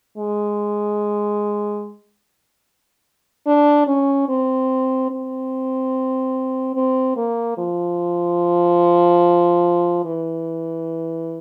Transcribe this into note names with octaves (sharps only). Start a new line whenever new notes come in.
G#3
D4
C#4
C4
C4
C4
A#3
F3
E3